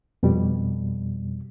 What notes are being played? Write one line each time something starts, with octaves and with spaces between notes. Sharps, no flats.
F2 B2 G3